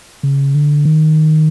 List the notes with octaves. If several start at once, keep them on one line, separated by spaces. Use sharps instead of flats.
C#3
D3
D#3